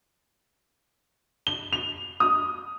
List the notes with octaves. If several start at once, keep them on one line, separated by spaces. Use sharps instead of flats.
G7
F7
D#6